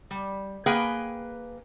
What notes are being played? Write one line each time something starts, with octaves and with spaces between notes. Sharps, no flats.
G3
A#3 G#4 B4 G5 G#5